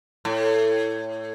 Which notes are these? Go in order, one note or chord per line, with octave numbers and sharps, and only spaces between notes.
A2